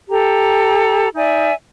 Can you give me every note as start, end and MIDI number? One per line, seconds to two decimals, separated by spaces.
0.10 1.08 67
0.10 1.08 69
0.10 1.08 82
1.15 1.52 63
1.15 1.52 74
1.15 1.52 76
1.15 1.52 80